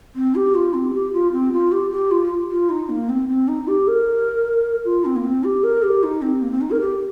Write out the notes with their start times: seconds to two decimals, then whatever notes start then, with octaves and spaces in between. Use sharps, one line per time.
0.16 C4
0.35 G4
0.55 F4
0.74 C4
0.94 G4
1.13 F4
1.32 C4
1.53 F4
1.72 G4
1.91 G4
2.11 F4
2.51 F4
2.70 D#4
2.89 A#3
3.09 C4
3.28 C4
3.48 D#4
3.68 G4
3.88 A#4
4.85 F4
5.05 C4
5.16 A#3
5.24 C4
5.44 G4
5.64 A#4
5.83 G4
6.03 D#4
6.22 C4
6.42 A#3
6.52 C4
6.61 D#4
6.71 A#4
6.81 G4